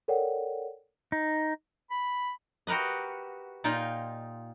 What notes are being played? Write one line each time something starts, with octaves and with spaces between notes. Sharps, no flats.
A4 A#4 C#5 D5 F#5 G5
D#4
B5
F#4 G4 A#4 B4 D#5
A#2 D#4 F4 G5